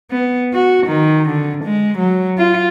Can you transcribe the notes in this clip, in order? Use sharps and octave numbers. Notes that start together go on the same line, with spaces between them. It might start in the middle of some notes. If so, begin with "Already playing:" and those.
B3
F#4
D#3
D3
G#3
F#3
F4